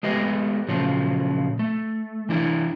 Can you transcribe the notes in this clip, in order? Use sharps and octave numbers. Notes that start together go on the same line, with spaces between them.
G#3 A3 B3 G4 D#5
A#2 C#3 F3 F#3 A3
A3
E3 D4 E4 D5